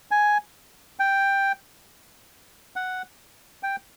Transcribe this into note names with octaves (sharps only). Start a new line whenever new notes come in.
G#5
G5
F#5
G5